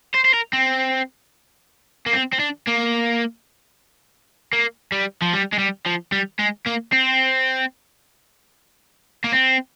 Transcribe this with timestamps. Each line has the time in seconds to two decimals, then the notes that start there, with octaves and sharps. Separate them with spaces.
0.14 C5
0.25 C5
0.34 A#4
0.53 C4
2.06 A#3
2.13 C4
2.32 C4
2.39 D4
2.67 A#3
4.53 A#3
4.92 G3
5.22 F3
5.33 G3
5.53 G#3
5.59 G3
5.86 F3
6.12 G3
6.39 G#3
6.66 A#3
6.92 C4
9.24 A#3
9.32 C4